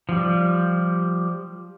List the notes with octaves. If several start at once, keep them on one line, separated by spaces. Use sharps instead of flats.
F3 G3